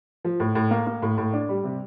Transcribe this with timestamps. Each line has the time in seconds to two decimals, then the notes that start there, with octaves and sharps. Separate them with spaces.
0.25 F3
0.40 A2
0.55 A2
0.71 A#3
0.87 A#3
1.02 A2
1.18 A2
1.33 D4
1.49 G3
1.64 C3